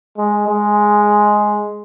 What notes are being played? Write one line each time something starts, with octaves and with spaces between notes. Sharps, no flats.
G#3
G#3